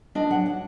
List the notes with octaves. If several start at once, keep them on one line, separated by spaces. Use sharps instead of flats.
D4 D#5
F#3 F#5
F#5